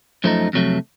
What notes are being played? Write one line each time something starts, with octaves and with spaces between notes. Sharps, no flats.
F#2 F3 A3 D#4
F2 C3 F#3 A3